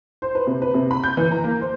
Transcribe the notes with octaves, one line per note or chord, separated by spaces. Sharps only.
C5
B4
C3
B4
C3
B5
G6
E3
A#5
A#3
C5